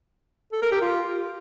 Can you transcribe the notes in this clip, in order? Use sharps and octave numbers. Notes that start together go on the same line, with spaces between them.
A4
A#4
G4
F4